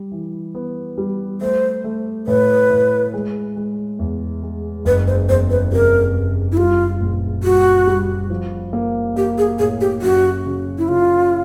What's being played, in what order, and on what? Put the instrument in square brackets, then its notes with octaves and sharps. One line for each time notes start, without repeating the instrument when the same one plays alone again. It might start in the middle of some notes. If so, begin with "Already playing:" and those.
Already playing: [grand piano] G3
E3
B3
G3
[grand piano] A3 [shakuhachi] C5
[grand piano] A3
[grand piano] A2 [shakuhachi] B4
[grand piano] A2
G#3
G#3
E2
G#3
[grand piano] F#1 [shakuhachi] B4
[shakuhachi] C5
[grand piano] E2 [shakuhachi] C5
[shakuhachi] B4
[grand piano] C3 [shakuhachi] A#4
[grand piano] F#1
[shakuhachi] E4
[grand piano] G3 [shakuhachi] F4
[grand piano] A#1
[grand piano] G3 [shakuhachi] F#4
[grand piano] G3
F3
A#3
[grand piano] A#3 [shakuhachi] G4
[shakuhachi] G#4
[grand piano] A2 [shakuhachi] G#4
[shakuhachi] G4
[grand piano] F#2 [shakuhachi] F#4
[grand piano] C#3
[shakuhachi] E4
[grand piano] C#3 [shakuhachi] F4